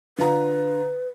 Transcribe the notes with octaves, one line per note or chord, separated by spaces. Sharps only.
D3 F4 B4 A#5